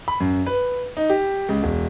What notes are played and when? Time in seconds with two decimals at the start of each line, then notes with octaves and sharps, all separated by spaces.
0.08 B5
0.20 F#2
0.46 B4
0.97 D#4
1.10 G4
1.49 C#2
1.63 E1